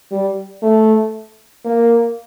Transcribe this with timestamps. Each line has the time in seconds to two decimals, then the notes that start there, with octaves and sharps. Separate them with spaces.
0.11 G3
0.63 A3
1.65 A#3